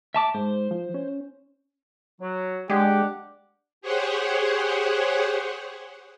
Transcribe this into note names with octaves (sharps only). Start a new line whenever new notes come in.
E5 A5 D6
G#2 C5
F3
C#4
F#3
G#3 D4 G4 F#5 D6
G4 G#4 C5 C#5 F#5